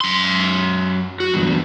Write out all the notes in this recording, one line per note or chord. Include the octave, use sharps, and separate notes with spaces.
F#2 C6
F#4
E2 G2